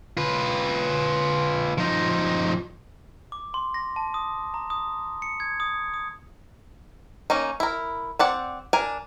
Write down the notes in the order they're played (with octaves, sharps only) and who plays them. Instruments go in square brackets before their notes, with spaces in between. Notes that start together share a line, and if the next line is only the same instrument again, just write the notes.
[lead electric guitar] F4 B4
F3 D#4
[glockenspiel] D6
C6
A#6
A5
D#6
A#5
D#6
C#7
G#6
D#6
D#6
[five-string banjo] A#3 C#4 D#4
E4 A#4
C4 D5 F#5
D4 A#4 G#5